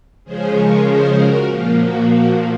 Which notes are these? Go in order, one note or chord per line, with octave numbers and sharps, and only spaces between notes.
C#3 F3 G#3 C#4 G#4 C5
A#4 C#5
G#4 C5
F#4 A#4
A#2 F3 A#3 F4
F#4
F#4